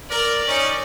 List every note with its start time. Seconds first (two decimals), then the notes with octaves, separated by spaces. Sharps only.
0.11 A#4 D5
0.48 C#4 D#4